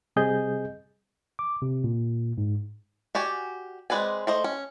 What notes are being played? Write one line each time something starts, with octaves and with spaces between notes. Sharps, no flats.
C3 G3 C4 G#4 D#5 G6
D6
C3
A#2
G#2
F#4 G4 D5 G#5
G#3 C4 B4 D5 G#5
A3 C5 D#5
C#4